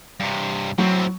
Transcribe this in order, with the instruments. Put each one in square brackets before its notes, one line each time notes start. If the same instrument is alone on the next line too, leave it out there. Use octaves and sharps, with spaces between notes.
[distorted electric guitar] G2 C3
[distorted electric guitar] A2 C4 [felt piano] F#3